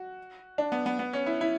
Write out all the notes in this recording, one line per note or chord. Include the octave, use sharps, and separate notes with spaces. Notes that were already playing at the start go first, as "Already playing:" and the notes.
Already playing: F#4
D4
B3
B3
B3
C#4
E4
E4